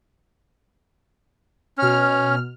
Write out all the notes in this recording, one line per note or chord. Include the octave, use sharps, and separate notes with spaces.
B2 C#4 F6